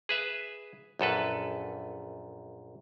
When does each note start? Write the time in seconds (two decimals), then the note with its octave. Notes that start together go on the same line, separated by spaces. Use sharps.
0.09 G#4 B4 E5
0.99 A#1 F#2 A4 B4